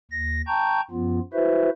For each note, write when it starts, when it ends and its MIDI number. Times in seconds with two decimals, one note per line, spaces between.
0.11 0.42 39
0.11 0.42 94
0.47 0.81 79
0.47 0.81 81
0.47 0.81 82
0.47 0.81 85
0.47 0.81 91
0.91 1.20 42
0.91 1.20 53
0.91 1.20 59
0.91 1.20 65
1.33 1.69 64
1.33 1.69 66
1.33 1.69 71
1.33 1.69 72
1.33 1.69 76